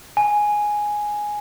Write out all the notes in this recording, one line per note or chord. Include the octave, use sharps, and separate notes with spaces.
G#5